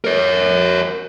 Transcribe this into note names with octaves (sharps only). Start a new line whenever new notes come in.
A#4 C#5